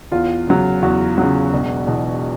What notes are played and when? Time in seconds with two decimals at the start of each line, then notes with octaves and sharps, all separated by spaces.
0.12 E2 F4
0.47 C#3 F#3
0.82 E2 F#4
1.18 C#3 F#3
1.53 E1
1.87 E2 B2